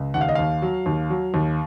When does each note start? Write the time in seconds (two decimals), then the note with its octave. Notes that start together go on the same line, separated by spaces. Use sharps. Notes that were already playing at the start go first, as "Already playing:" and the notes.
Already playing: C#2
0.14 D#2 F#5
0.21 F5
0.29 D#5
0.35 D#2 F5
0.62 F#3
0.86 D#2
1.10 F#3
1.34 D#2